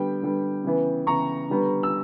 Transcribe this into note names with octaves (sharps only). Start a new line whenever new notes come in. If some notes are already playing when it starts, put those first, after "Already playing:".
Already playing: D3 G3 B3 G5
D3 G3 B3
C#3 E3 B3
C#3 E3 B3 A#5 C#6
D3 G3 B3
E6